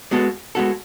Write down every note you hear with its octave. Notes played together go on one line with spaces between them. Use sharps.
G#3 B3 F#4 A4
G#3 B3 F#4 A4